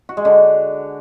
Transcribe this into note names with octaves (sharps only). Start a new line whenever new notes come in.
F#4
G#3
D3